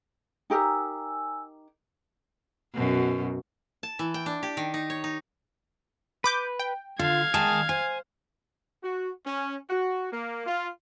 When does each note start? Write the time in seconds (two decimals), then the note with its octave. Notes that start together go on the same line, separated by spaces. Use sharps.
0.50 D#4 G4 A#4 G#5 E6
2.74 F#2 B2
3.83 A5
3.99 E3
4.14 G5
4.26 D4
4.43 G4
4.57 D#3
4.74 D#4
4.90 C#5
5.04 D#4
6.24 B4 B5 D6 G6
6.59 G5
6.99 D3 F4 F5 G#6
7.34 D#3 G#3 G#4 A#4 A5
7.69 C5 G#5
8.82 F#4
9.26 C#4
9.70 F#4
10.11 A#3
10.46 F4